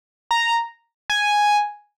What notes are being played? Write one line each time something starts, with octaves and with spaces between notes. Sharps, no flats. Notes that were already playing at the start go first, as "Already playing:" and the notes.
A#5
G#5